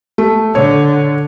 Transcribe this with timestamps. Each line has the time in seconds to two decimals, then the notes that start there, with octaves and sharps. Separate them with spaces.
0.18 A3
0.55 D3 C#5